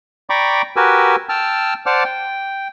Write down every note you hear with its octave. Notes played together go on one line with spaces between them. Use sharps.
D5 G5 A#5 B5 C#6 D6
F#4 G4 A#4 B4 G#5 E6
G5 A5 E6 F6
C5 D5 F#5 A5 D6 F6
G5